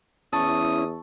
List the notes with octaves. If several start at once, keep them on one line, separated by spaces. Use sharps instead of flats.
E2 C#4 E4 A5 C#6 D#6 E6